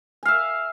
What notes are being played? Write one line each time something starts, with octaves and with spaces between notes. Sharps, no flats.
E5 F5 G#5